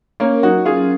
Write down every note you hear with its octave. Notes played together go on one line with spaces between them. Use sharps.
A#3 C#4 A#4
F#3 D#4 F#4
C#4 F4 G#4